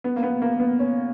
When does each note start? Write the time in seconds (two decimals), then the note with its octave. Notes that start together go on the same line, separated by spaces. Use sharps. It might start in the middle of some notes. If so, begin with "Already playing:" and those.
0.04 B3
0.16 A#3
0.23 B3
0.42 A#3
0.60 B3
0.79 C#4